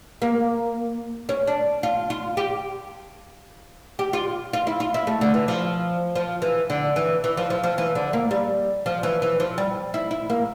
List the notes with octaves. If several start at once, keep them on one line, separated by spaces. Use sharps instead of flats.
A#3
C#4
D4
F4
F4
G4
G4
F4
F4
E4
F4
E4
A3
D3
E3
F3
F3
E3
D3
E3
E3
F3
F3
F3
E3
D3
A#3
G3
F3
E3
E3
F3
G3
E4
E4
A#3